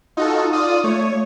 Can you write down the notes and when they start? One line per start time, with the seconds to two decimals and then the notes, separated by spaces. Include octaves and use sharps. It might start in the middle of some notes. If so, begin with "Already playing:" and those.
0.17 D#4 F4 F#4 A4
0.53 F4 D5 D#6
0.84 A3 C#5